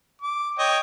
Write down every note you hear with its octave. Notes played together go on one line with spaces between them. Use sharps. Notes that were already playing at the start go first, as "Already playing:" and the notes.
D6
C#5 D#5 G5